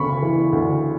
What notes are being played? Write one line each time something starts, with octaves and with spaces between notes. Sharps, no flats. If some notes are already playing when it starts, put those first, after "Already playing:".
Already playing: D2 C#3 B5 C#6
E3
D2